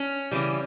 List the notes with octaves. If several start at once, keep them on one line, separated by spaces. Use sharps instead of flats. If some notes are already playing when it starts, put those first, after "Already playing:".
Already playing: C#4
C#3 E3 G3